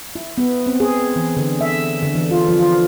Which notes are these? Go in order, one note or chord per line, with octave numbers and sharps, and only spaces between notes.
E4
B3
C4
G#4
E3
D3
E5
D3
E3
F4
F3
F4